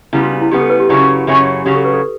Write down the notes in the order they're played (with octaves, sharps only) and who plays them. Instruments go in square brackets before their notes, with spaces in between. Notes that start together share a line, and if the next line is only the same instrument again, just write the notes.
[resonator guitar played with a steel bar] C#3 G3 B3 [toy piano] E4
[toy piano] F#4
D4
E4
[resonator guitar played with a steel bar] C#3 G3 B3 [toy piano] G4
[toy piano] A4
B4
G4
[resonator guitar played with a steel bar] F#2 C#3 F#3 C#4 [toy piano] E4
[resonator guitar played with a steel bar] F#2 C#3 F#3 C#4
[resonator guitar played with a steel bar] C#3 F#3 C#4 [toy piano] G4
[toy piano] A4
B4
A4